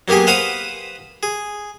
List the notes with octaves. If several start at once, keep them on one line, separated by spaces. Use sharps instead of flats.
F#3 A#3 B3 G4 G#4
B4 C5 F5 F#5 B5 D#6
G#4